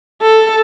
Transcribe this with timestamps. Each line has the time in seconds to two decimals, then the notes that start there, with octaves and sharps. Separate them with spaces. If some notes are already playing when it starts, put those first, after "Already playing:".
0.22 A4